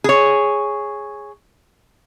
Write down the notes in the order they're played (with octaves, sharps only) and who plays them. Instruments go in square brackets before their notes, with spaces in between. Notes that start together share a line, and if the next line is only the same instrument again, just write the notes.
[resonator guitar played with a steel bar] G#4 C#5